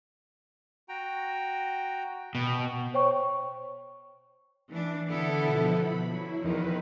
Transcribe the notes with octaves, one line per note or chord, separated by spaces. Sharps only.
F#4 G5 A#5
B2 G5
C5 C#5 G5 C#6
E3 D4
D3 B3 E4 A4
B2 F3
B5
F#3 E4
E2 D#3 F3 B4